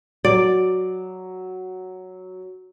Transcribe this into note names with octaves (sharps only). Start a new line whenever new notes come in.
F#3 D5